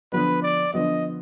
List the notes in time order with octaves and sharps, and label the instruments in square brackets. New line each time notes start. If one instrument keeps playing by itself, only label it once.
[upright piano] D3 F3 B3 [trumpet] B4
[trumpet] D5
[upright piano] D3 F3 B3 [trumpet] D#5